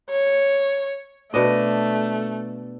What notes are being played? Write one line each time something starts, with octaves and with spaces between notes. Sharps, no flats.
C#5
B2 A3 D4 D#5